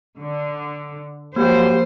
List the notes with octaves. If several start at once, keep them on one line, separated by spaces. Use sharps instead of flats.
D3
F3 F#3 G#3 A#3 G4 C5